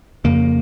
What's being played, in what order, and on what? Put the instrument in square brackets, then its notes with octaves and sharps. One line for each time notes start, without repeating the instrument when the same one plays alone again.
[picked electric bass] F2 C#3 A#3